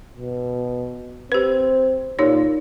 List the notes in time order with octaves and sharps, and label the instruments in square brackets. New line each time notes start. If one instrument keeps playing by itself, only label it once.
[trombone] B2
[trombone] C4 [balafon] G4 B4
[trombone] A#2 [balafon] D#4 G4 C#5